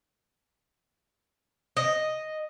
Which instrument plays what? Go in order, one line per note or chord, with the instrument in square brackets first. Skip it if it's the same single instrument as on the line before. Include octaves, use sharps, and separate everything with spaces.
[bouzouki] D#5